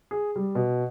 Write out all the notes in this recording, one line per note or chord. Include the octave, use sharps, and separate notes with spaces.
G#4
G3
B2